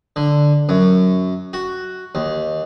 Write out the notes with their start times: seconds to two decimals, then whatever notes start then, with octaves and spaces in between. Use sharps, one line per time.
0.16 D3
0.69 F#2
1.53 F#4
2.15 D#2